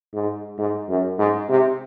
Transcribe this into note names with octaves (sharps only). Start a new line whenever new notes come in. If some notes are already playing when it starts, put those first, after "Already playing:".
G#2
G#2
F#2
G#2
C3